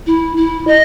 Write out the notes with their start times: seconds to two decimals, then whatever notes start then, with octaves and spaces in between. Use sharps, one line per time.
0.06 E4
0.36 E4
0.67 D#5